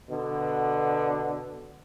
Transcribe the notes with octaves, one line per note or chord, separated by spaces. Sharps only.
B2 D3